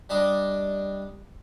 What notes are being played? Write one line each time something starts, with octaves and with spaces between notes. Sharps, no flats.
G3 D4 D#5